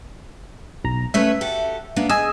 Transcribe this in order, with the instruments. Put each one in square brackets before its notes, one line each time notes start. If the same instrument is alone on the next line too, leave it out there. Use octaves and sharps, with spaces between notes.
[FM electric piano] B1 A#5
[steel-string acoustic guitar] A3 C#4 B4 [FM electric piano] E5
[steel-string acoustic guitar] F#4 G4 A4
A#3 B3 D4
[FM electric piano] G#4 D#5 E6 [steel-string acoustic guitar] G#5